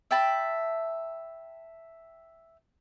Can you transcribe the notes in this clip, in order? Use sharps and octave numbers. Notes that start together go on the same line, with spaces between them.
E5 G5 A5 B5